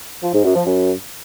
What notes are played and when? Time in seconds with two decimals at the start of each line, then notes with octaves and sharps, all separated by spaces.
0.22 F3
0.33 G#2
0.44 F#2
0.55 F3
0.66 F#2